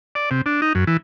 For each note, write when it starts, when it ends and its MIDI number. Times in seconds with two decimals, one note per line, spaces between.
0.15 0.30 74
0.31 0.41 48
0.46 0.61 62
0.62 0.73 63
0.75 0.84 42
0.87 0.97 52